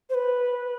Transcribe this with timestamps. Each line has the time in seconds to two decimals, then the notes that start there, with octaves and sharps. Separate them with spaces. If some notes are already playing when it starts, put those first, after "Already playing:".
0.10 C5
0.14 B4